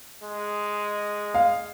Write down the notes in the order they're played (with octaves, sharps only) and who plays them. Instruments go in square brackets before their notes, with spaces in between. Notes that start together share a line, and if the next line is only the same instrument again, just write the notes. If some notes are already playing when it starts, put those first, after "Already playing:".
[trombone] G#3
[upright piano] F5